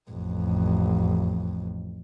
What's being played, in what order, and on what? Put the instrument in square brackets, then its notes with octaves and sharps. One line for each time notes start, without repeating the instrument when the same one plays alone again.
[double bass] A1 F2